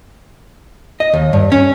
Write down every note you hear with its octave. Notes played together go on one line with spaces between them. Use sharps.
D#5
D#2
G2
C#4